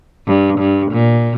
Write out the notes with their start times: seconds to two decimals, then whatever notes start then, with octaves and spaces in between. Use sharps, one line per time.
0.27 G2
0.59 G2
0.92 A#2